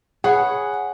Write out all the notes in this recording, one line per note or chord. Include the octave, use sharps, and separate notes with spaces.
G#4 B4 C#5 F#5